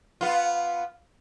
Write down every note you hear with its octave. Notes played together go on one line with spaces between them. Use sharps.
B3 F4